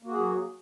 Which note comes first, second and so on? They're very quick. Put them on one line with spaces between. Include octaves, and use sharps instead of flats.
A#3 F#4 G#4 F#3